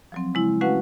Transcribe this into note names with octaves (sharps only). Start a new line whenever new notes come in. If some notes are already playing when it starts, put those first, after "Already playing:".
F3 F#3 C4
C#3 G#3 E4
A3 C#4 F#4 B4 F5 F#5